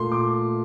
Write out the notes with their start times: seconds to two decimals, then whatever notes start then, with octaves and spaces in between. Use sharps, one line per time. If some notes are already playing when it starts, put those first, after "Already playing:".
Already playing: A#2 A3 C6
0.12 D6